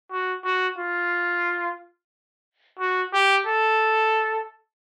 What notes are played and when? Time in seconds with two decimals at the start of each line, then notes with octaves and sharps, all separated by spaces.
0.11 F#4
0.44 F#4
0.78 F4
2.79 F#4
3.13 G4
3.47 A4